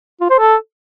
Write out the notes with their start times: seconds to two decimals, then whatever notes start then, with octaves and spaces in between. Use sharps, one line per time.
0.21 F4
0.30 C5
0.39 A4